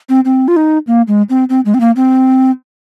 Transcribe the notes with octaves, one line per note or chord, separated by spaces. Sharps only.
C4
C4
F4
D#4
A#3
G#3
C4
C4
G#3
C4
A#3
C4